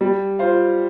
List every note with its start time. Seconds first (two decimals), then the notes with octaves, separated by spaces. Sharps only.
0.01 G3
0.39 F4 C5 F5